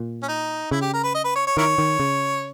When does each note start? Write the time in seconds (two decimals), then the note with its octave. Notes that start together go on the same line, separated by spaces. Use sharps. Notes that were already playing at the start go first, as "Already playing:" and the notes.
Already playing: A#2
0.23 C#4
0.28 D#4
0.71 C#3 E4
0.82 G4
0.93 A#4
1.04 B4
1.15 D#5
1.24 B4
1.35 C#5
1.47 C#5
1.57 D#3 E4 A#4 C#5
1.78 D#3
2.00 C#3